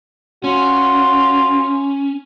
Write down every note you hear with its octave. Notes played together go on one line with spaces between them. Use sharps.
C#4 F4 F#4